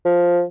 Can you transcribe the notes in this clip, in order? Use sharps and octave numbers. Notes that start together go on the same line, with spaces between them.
F3